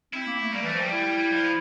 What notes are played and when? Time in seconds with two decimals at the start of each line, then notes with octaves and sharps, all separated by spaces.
0.13 C4 E4
0.26 A#3
0.40 A3
0.52 G3 A#3
0.62 E3 A3
0.72 F3
0.79 G3
0.92 E4
1.31 F3